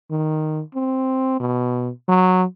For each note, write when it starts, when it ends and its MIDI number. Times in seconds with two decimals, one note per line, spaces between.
0.11 0.62 51
0.75 1.40 60
1.40 1.90 47
2.09 2.44 54